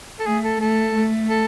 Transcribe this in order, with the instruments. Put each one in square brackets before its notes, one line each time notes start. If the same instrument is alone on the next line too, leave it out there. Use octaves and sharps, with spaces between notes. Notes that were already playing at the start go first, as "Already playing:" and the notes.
[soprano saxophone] A4
[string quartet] A3 [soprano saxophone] G#4
[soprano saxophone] A4
[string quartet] A3 [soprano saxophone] A4
[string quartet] A3
[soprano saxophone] A4